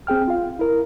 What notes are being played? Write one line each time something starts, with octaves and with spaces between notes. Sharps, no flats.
C4 G#4 G5 F6
F4 F5
E4 A#4